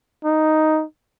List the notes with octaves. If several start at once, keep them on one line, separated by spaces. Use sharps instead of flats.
D#4